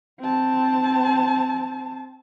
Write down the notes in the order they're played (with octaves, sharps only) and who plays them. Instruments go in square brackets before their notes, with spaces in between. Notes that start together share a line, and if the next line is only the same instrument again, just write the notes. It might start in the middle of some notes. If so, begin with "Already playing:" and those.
[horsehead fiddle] C4 A5